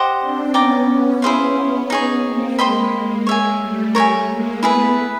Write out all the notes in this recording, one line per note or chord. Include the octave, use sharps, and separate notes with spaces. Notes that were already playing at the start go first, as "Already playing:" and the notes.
Already playing: G4 C5 D#5 F#5
C4 D4
B3 C#4 D5 G5 A#5 D6
B3 C#4
B3 C#4 E4 G#4 C5 F5
D#4 G#4 C#5
A#3 C4
G#3 A#3 C5 D#5 G5 B5
G#3 A#3
C#5 E5 G#5
G3 A3
A#4 C#5 E5 G#5
G#3 A#3
A3 B3 E4 G#4 B4